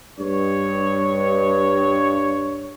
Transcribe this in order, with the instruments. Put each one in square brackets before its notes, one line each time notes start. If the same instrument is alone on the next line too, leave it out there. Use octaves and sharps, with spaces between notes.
[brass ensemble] G2 C#5